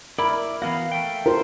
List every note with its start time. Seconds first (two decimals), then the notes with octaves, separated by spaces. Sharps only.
0.19 E4 A#4 D5 B5
0.62 E3 B3 F#4 F5
0.92 A3 G5
1.26 E4 F4 A#4 C5